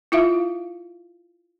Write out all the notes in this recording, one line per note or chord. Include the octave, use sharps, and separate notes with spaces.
E4 F4 E5 F5